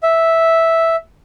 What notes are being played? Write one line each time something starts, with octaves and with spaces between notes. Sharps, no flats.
E5